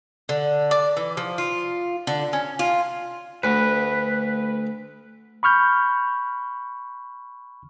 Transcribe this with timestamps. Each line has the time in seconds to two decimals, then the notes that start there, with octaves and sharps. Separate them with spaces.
0.29 D3
0.71 D5
0.97 E3
1.17 F3
1.38 F4
2.07 D3
2.33 C#4
2.59 F4
3.43 D2 B4
5.43 B5 C#6 F6 G6